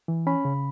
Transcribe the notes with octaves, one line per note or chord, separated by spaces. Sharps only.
E3
C#4 B5
C#3